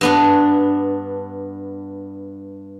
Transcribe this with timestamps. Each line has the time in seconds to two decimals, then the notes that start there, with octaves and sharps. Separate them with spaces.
0.01 G2 B3 D4